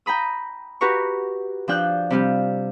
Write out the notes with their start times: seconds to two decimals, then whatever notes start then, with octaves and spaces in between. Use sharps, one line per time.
0.06 G5 A#5 B5 D#6
0.81 F#4 G4 B4 A#5 C#6
1.68 F3 D4 G5 F#6 G6
2.11 C3 G3 F4 G4